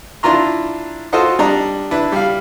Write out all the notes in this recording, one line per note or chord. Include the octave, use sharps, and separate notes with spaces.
D4 E4 F4 A#5 C6
F4 F#4 A4 C5 D#5 F#5
G3 D4 D#5 A#5
D4 E4 B4
G3 F5